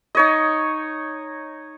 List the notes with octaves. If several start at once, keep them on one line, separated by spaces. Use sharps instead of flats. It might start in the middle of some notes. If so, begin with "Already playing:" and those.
D#4 C#5 D#5